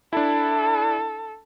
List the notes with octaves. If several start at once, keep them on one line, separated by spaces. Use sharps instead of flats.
D4 E4 A4